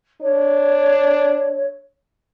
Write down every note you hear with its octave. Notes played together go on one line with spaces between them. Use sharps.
D4 C#5